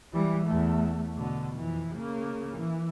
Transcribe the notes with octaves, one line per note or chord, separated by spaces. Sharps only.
E3 G3
E2 A3
B2 D3
F2 E3
C#3 A#3
E3